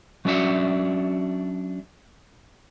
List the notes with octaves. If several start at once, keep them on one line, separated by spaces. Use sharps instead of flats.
F#3 C#4 D4 F#4 E5 F#5